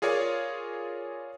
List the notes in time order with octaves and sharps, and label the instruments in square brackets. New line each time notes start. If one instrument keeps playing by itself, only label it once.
[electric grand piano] F4 G#4 A#4 C#5 D5 G#5